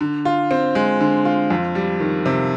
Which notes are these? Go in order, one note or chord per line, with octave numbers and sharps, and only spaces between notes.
D3
F4
C4
G#3
D3
F4
F2
G3
D#3
C3